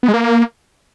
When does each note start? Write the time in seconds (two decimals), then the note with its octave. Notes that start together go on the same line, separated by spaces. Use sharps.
0.03 B3
0.08 G#3
0.14 A#3